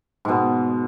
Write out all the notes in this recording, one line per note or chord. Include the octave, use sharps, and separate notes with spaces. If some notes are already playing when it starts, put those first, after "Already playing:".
G#2 B2